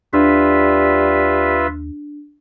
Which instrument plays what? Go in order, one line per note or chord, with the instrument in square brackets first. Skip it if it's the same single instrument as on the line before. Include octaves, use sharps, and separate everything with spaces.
[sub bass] D#2 [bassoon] G3 [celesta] D4 [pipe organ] F4 B4 E5